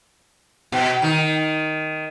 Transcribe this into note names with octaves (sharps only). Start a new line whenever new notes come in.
B2
D#3